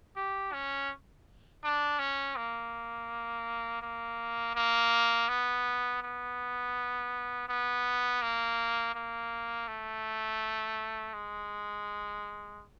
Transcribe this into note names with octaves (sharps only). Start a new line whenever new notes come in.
G4
C#4
D4
C#4
A#3
A#3
A#3
B3
B3
B3
A#3
A#3
A3
G#3